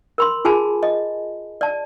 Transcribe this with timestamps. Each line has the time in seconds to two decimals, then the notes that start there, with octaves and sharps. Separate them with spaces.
0.18 A#4 B5 C6
0.45 F4 G#4 G#5 A5 B5
0.83 D#5
1.61 D5 A5